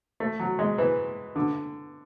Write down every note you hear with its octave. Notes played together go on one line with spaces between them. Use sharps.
A3
F#3
G#3
E3
D3